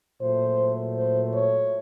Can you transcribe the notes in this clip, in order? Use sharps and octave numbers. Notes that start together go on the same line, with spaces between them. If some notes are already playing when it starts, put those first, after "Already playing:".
A#2 F#3 A3 C5
C5
C#5